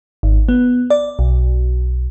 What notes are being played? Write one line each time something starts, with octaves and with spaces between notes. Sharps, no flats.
G#1
B3
D5
B1